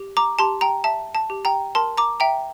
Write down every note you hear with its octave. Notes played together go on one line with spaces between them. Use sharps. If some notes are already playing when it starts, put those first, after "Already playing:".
Already playing: G4
A#5 D6
G4 A5 C6
G5 A#5
E5 A5
A5
G4
G5 A#5
A#4 A5 C6
A#5 D6
E5 G5 A#5